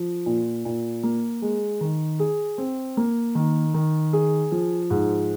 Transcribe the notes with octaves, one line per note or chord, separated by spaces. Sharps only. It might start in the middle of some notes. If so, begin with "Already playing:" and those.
Already playing: F3
A#2
A#2
A#3
G#3
D#3
G#4
C4
A#3
D#3
D#3
G#4
F3
G#2